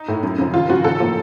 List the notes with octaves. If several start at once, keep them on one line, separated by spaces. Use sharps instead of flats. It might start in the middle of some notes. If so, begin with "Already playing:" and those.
Already playing: D#4
A2 A3
F#2
C#3 F3
D#2 F4
C#3 F3 F#4
A1 A4
A2 F3 A#3